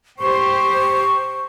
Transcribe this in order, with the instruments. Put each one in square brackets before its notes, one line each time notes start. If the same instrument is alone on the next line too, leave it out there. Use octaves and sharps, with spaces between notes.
[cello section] G4 C5 [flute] C#6